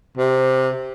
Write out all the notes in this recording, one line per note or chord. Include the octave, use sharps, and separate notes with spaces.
C3